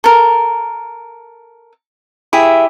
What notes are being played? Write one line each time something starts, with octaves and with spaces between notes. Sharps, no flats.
A4 A#4
E4 G4 G#4 E5